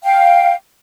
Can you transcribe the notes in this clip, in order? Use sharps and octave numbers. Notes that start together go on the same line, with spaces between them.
F5 G5